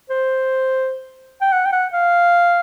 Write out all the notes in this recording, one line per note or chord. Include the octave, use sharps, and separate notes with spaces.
C5
G5
F#5
G5
F#5
F5